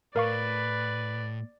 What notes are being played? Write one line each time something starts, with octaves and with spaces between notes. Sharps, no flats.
A2 A#4 B4 D5 F5 C#6